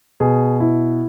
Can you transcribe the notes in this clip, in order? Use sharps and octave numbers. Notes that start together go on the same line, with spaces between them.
B2 G#4
E4